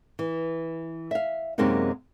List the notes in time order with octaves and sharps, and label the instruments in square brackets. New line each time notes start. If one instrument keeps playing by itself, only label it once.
[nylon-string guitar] E3
E5 F5
F#2 C3 G#3 A#3 C4 D#4